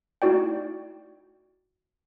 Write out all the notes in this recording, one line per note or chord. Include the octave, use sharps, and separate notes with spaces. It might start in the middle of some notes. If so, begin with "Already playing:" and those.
A3 D#4 E4 F#4 D5 G5